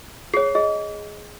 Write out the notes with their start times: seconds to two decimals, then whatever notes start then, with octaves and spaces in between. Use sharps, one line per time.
0.34 G#4 C#5 C7
0.55 G#4 D#5